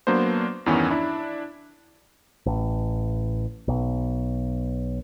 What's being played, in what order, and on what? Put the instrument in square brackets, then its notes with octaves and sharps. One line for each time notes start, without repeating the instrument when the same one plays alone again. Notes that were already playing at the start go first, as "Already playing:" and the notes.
[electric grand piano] F#3 A#3 B3 D4 C5
E2 G2 D#3 E3 B3 C#4
D4 E4
[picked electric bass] A1
B1